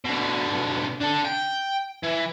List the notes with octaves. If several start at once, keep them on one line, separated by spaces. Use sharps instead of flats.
B2 D3
D4 A4
G5
E3